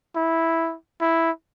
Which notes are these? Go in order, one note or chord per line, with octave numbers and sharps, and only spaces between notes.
E4
E4